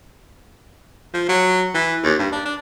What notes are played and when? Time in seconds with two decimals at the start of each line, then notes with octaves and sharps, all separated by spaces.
1.14 F3
1.29 F#3
1.74 E3
2.03 D#2
2.19 G2
2.32 D4
2.45 D4